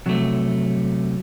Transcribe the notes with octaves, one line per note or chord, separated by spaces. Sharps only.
C3 F#3 A3